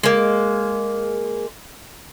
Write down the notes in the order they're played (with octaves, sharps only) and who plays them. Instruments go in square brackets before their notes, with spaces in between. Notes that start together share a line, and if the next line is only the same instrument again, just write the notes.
[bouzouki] G#3 A#3